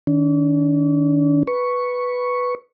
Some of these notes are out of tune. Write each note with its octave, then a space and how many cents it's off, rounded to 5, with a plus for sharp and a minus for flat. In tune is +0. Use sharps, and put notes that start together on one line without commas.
D#3 +0 D4 -45
B4 +0 C#6 +0